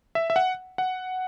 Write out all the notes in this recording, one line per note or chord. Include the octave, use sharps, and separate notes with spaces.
E5
E5
F#5
F#5